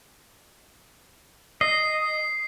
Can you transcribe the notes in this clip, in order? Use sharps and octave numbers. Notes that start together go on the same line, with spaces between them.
D#5 C7